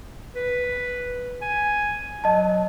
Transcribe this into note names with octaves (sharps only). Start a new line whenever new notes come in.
B4
G#5
F#3 D#5 A5